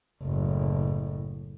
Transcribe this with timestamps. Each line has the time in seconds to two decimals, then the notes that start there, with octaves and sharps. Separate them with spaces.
0.23 F#1 A2